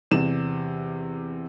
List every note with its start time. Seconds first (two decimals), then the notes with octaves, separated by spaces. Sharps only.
0.11 E2 C3 E7